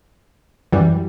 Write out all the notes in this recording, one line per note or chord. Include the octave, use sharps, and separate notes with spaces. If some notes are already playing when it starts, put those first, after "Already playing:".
F#2 E3 G3